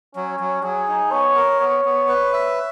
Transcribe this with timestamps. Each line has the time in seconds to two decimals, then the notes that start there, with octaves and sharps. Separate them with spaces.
0.16 F#3 C#4
0.40 F#3
0.64 F#3 G#4
0.88 D#4
1.12 B3 C#5
1.36 A#4
1.60 B3 C#5
1.85 B3
2.09 B4
2.33 E5